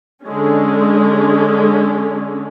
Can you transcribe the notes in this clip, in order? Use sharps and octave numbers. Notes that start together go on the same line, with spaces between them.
D3 G#3 C#4